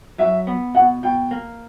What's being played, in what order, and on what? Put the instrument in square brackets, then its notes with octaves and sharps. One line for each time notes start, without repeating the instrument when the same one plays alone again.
[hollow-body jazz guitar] F#3 [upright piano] E5
[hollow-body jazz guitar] B3
[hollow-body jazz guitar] B2 [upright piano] F#5
[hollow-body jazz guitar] B2 [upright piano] G5
[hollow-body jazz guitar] A#3